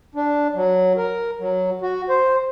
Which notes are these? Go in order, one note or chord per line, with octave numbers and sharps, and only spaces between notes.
D4
F#3
A#4
F#3
F#4
C5